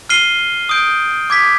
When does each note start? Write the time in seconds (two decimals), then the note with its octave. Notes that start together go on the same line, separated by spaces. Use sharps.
0.09 F6 C7 D#7 G7
0.69 D#6 G6 D7
1.30 D6 G#6 B6